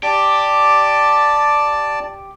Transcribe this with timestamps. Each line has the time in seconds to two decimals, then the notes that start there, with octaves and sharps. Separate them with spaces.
0.03 G4 D5 A5